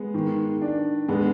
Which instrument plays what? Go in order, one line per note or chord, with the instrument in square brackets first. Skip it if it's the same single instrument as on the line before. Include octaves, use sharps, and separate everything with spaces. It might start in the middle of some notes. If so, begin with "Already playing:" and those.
Already playing: [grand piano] G#3 B3
[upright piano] D#3
D4
[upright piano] D3 [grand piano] G#3 B3